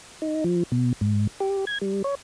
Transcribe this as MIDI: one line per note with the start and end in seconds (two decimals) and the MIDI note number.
0.22 0.44 63
0.44 0.63 53
0.72 0.93 47
1.01 1.27 44
1.40 1.65 67
1.67 1.78 92
1.81 2.02 55
2.04 2.15 73